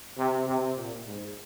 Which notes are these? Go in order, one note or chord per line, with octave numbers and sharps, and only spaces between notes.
C3
C3
A#2
G#2